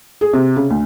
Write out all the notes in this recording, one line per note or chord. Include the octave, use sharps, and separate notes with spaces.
G#4
C3
C#3
D2